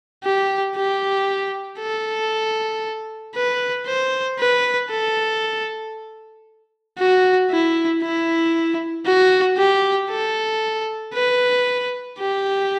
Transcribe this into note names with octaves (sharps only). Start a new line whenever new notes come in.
G4
G4
A4
B4
C5
B4
A4
F#4
E4
E4
F#4
G4
A4
B4
G4